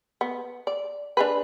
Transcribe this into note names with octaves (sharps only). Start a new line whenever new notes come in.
B3
D5
D4 G#4 B4